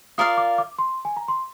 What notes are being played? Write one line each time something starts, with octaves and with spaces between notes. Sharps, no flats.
F4 A#4 D5 F5 D#6
D6
D6
C6
G#5
A#5
C6